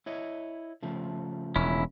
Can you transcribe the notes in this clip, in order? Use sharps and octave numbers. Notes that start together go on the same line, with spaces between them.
E4 C#5 D#5
C#3 F3 A3
E1 C#4 E4